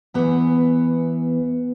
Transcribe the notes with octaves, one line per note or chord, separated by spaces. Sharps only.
E2 E3 B3